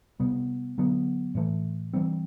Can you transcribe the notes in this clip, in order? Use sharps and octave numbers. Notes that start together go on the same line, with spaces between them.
C3 G3 B3
D3 F#3 B3
A2 E3 A3
E3 G3 C4